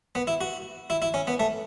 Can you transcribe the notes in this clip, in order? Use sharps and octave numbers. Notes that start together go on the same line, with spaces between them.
B3
E4
F#4
E4
E4
C#4
B3
A3